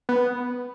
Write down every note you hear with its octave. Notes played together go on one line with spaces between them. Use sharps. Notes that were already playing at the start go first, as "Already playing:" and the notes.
B3